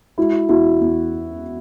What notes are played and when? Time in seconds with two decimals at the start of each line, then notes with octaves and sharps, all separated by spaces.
0.18 G#3 E4 F#4
0.49 E2 E4 F#4
0.81 E2